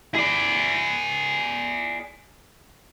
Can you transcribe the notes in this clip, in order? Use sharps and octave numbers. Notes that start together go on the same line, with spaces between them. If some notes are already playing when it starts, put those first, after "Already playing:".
G#4 D5